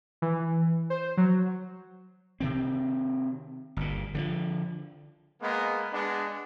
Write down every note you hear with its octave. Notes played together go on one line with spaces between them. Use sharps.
E3
C5
F#3
C3 D#3 C4
G1 A#2
D3 D#3 F3
G#3 A#3 B3
G#3 B3 D4